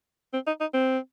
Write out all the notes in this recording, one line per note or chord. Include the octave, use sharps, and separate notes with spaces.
C4
D#4
D#4
C4